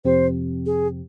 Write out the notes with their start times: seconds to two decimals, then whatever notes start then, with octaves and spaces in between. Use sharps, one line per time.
0.04 F2 C3 F3 C4 G4 C5
0.66 G#4